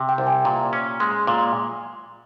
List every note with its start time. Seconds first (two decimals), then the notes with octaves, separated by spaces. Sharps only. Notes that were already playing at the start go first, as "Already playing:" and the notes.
Already playing: C3
0.09 G5
0.18 C2
0.27 G#5
0.45 A#2 A#5
0.73 C#4
1.00 G#3 C6
1.19 C6
1.27 A#2